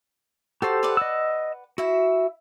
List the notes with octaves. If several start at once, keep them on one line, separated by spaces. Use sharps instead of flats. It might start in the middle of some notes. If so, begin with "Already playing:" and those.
F#4 G4 A4 C5 A5
B4 D5 F#5
D#5 E6
E4 F#4 E5